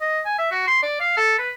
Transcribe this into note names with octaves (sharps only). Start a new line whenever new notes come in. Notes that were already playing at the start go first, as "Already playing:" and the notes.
D#5
G#5
E5
F#4
C6
D5
F5
A4
B4